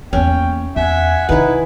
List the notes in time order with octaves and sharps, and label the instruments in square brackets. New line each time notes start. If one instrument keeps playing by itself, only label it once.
[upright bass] E2 A#3 [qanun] C#4 [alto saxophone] G5
[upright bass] E2 [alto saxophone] E5 [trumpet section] F#5 G#5
[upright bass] C3 D#3 [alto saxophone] D#4 [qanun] E4 B4